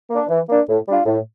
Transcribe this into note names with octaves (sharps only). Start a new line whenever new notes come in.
A#3 D4
E3
A#3 D4
A2
G3 D4 F4
A2